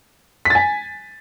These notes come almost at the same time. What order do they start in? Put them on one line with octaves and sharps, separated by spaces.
B6 A6 G#5